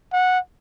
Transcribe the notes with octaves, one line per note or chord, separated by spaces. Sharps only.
F#5